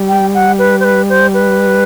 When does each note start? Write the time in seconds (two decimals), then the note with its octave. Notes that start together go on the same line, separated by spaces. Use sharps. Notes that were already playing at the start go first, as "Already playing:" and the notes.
Already playing: G3
0.09 G5
0.34 F#5
0.59 B4
0.80 C5
0.84 B4
1.09 C5
1.34 B4